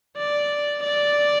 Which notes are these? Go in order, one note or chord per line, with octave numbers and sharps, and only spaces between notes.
D5
D5